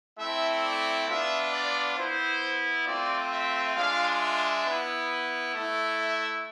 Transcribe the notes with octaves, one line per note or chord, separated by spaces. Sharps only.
A3 C4 E4 E5
D5
B3 D4 F4 E5
D5
B3 E4 C5
A3 C4 F4 D5
E5
G#3 D4 F4 F5
E5
B3 E4
A3 E4
E5